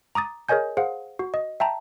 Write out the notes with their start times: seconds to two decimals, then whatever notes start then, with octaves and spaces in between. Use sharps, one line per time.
0.15 A#5 D6 D#6 A6
0.49 G#4 A#4 C#5 D#5 G#5 G6
0.77 G#4 C5 F5 F#5
1.19 F#4
1.34 D#5
1.60 E5 G5 A5 A#5